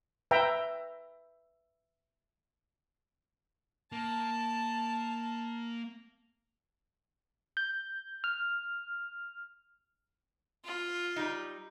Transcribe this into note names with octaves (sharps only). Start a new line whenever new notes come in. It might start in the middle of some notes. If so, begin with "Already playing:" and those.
B4 E5 G5 A#5
A#3 A5
G6
F6
F4
G3 D#4